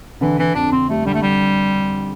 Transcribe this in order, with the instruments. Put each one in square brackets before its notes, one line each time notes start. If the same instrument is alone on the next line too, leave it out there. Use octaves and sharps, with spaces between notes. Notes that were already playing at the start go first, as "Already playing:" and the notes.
[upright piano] D3 [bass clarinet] E3
[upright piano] D3 [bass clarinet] E3
[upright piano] F2 [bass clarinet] D4
[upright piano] D3 [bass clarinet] C4
[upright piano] G3 [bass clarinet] A3
[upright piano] D3 [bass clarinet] G3
[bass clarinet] A3
G3